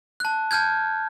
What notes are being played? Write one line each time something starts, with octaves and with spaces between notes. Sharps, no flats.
A5 F#6
A5 F6 G6 G#6